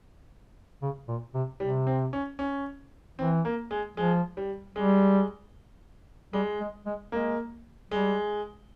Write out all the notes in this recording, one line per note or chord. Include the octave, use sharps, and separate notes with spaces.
C#3
A#2
C3
C3 G3
C4
C#4
C#4
E3 C4
A#3
G#3
F3 G#3
G3
G3 G#3
G3 G#3
G#3
G#3
G#3 A#3
G3 G#3